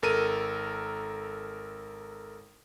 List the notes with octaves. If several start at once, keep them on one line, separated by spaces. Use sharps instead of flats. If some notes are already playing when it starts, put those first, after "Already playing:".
G#1 A4 A#4 A#5 D#7